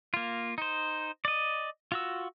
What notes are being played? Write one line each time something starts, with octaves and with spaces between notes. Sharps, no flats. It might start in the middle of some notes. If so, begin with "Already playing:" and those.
A#3 F4
D#4 C5
D5 D#5
F4 F#4 E6